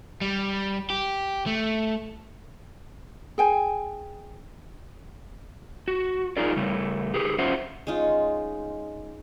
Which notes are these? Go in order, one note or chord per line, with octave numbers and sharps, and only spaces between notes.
G3
G4
A3
G#4 G5 G#5
F#4
D#4 F4 G#4 A#4 D5
C#3 G3 A3
G4 G#4 B4
F#3 C#4 F4 C5 E5 F#5
G#3 C#4 D#4 F4